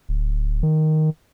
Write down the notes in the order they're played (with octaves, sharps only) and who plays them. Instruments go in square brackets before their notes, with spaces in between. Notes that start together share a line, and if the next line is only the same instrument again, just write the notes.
[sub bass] D1
D#3